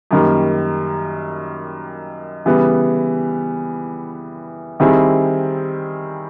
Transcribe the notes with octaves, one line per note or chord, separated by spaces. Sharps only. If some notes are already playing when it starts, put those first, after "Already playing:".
F#2 D#3 G3 A#3
C#3 E3 G3 B3
D#3 G3 C4 E4 G#4